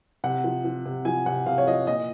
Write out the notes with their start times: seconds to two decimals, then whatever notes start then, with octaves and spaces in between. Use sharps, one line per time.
0.24 C3 F#5
0.44 F3
0.65 F3
0.86 C3
1.05 F3 G#5
1.26 C3 F#5
1.46 C3 F5
1.58 C#5
1.67 F3 D#5
1.87 A#2 D#5